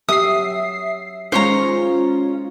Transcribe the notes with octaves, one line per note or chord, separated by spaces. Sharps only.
F#3 G4 E5 D#6 C7
G#3 C#4 D#4 F4 C5 C#5 A#5